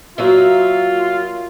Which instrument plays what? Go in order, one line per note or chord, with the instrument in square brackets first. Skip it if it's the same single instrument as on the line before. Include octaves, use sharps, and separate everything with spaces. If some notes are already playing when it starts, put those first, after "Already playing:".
[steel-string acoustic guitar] F#3 A#3 E5 [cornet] F4